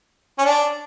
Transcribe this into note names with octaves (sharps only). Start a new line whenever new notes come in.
C#4
D4